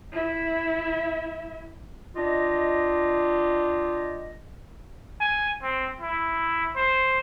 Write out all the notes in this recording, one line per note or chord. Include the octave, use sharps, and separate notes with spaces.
E4 E5
D4 F4 G4 D#5
G#5
C4
E4
C5